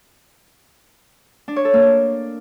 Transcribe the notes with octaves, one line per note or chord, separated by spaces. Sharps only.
D4
C#5
A4
A#3
D4